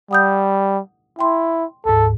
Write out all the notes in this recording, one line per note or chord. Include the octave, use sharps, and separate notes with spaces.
G3 F#5 D#6 G6
E4 G5 C6
D2 G#2 A4